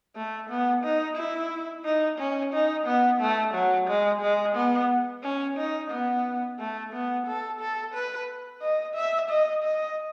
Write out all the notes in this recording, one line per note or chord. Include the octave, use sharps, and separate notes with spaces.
A3
B3
D#4
E4
D#4
C#4
D#4
B3
A3
F#3
G#3
G#3
B3
C#4
D#4
B3
A3
B3
A4
A4
B4
D#5
E5
D#5
D#5